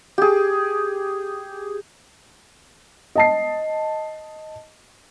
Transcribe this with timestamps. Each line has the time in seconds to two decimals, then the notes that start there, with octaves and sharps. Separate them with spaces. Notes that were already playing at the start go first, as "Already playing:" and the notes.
0.18 G4 G#4
3.15 D#5 A5 C7